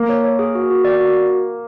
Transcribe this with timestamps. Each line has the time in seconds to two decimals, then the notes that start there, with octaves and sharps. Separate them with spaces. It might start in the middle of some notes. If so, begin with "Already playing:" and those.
Already playing: A#3
0.09 C#5
0.24 C#5
0.39 G#4
0.55 F#4
0.70 F#4
0.85 D5
1.00 F#4